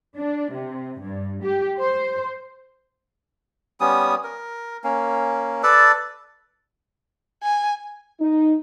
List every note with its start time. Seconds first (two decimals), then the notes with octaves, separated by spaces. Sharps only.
0.16 D4
0.52 C3
1.00 G2
1.43 G4
1.78 C5
3.80 G3 B3 C#4 D#6
4.24 A#4
4.84 A#3 C#4
5.63 A4 B4 D5 A5
7.43 G#5
8.20 D#4